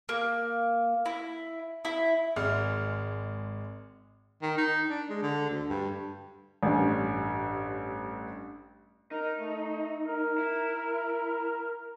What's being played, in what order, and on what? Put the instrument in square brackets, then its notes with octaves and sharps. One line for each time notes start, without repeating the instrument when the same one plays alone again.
[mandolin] A#3
E4
E4
[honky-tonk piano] G#1 G#3 F6
[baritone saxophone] D#3
D#4
D4
G#3
D3
D2
G2
[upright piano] A1 G2
[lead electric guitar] D#4 [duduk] A#4
[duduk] A3
A#4
[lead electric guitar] E4